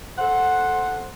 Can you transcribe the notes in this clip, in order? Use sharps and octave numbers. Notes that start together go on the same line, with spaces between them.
A4 C5 F#5